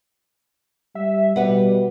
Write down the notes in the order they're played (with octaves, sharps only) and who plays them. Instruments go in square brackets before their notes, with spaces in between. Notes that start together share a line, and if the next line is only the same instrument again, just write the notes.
[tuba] G3 [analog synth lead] E5
[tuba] B2 [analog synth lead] G3 [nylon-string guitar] G4 B4 F#5